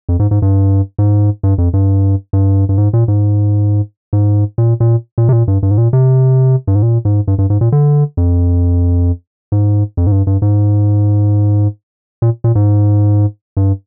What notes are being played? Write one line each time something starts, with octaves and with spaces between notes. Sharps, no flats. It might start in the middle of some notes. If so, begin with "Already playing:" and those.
F2
G#2
G#2
G2
G#2
G2
F2
G2
G2
G2
G#2
A#2
G#2
G#2
A#2
A#2
A#2
C3
A#2
G2
G2
G#2
A#2
C3
G2
G#2
A#2
G#2
G2
G2
G#2
A#2
D3
F2
G#2
F2
G#2
G2
G2
G#2
A#2
A#2
G#2
G2